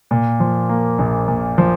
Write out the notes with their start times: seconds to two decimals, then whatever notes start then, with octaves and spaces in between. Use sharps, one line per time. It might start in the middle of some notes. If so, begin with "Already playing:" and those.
0.11 A#2
0.40 F3
0.69 A#3
0.99 A#1
1.28 A#2
1.58 F3